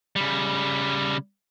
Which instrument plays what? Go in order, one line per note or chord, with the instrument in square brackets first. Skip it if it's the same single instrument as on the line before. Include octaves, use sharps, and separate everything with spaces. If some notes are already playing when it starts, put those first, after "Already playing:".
[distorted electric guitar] C#3 G3